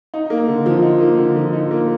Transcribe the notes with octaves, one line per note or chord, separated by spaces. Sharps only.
D#4
A#3
D3
F3
D#4
A#3
D3
F3
D#4
A#3